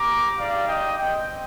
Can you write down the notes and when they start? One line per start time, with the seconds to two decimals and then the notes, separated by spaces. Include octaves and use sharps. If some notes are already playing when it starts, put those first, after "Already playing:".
Already playing: C4 G4 A#5 D6
0.38 G#3 D#4 G4 D5 F5
0.68 D#5 G5
0.99 C4 G4 D#5 G5